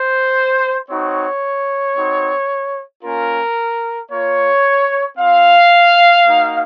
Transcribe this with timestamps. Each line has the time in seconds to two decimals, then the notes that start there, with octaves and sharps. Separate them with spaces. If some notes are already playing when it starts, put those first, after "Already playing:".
Already playing: C5
0.88 C4 D#4 F#4 C#5
1.95 C4 D#4 F#4
3.02 A#3 C#4 F4 A#4
4.10 A#3 F4 C#5
5.17 C4 F4 F5
6.25 A#3 D#4 F#4